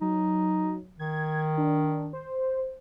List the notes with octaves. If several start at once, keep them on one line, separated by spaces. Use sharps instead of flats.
F#3 D#4
D#3 G#6
D4
C5